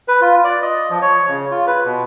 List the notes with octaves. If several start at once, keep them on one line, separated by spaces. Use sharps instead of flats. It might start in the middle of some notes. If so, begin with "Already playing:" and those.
B4
F4
D5
D#5
F3
C#5
C#3
F4
B4
B2